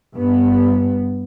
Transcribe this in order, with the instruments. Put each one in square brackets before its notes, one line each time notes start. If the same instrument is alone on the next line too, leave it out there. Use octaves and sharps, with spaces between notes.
[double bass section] G2 B3